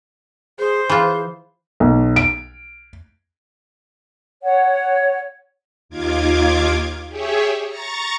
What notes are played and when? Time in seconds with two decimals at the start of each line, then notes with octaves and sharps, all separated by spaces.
0.59 G#4 C5
0.90 E3 F4 G#4
1.80 B1
2.16 D7
4.44 C#5 F#5
5.89 D#2 D#3 F4 D6 G#6
7.08 G4 G#4 C#5 E5
7.68 A#5 C#6 A6